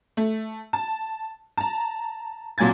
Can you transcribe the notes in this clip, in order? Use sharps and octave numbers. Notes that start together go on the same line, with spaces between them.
A3
A5
A5 A#5
C2 A#2 F#3 G#5 G#6 A6